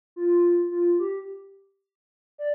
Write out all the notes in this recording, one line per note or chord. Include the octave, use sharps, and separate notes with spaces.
F4
F4
G4
D5